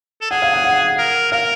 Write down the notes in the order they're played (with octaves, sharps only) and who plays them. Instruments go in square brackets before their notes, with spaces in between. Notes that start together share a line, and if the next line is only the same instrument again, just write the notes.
[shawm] A4
[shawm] G#4 [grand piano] F#5
[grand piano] F5
F#5
F#5
[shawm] A#4
[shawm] A#4 [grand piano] F5